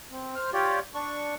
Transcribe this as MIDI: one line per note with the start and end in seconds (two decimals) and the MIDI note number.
0.12 0.35 60
0.35 0.50 72
0.35 0.50 89
0.53 0.79 65
0.53 0.79 67
0.53 0.79 73
0.53 0.79 74
0.94 1.35 62
0.94 1.35 85